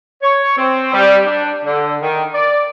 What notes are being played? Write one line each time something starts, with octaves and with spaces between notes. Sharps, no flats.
C#5
C4
G3
D4
D3
D#3
D5